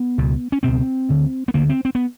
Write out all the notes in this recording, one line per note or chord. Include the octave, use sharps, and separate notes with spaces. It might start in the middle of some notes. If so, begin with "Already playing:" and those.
Already playing: B3
C#2 B2
C#4
C#2 B2 C4
D2 D3
B3
D2 D3 A#3
C4
C4
B3